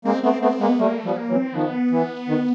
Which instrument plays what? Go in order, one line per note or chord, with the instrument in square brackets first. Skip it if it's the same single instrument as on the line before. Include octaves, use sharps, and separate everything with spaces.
[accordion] G#3 A#3 [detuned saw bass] C4
[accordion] A3 B3 [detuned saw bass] C4
[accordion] A3 B3 [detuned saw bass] C4
[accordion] G#3 A#3 [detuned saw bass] B3
[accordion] G3 A3 [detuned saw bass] A#3
[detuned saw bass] A3
[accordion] F3 G3
[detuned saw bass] B3
A#3
[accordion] E3 F#3
[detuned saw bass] C4
[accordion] D#3 F3 [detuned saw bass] B3
[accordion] E3
D#3